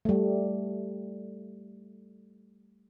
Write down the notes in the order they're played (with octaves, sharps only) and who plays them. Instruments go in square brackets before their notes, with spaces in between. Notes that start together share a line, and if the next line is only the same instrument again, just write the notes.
[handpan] G3 A3